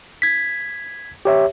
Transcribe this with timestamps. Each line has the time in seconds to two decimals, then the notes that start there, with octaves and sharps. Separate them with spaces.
0.22 G#6 B6
1.25 G4 C#5 E5